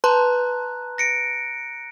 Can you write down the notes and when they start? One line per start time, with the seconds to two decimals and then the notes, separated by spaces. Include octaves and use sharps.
0.04 B4 A5 A#5 C6 F#6
0.98 A#6 C#7 D7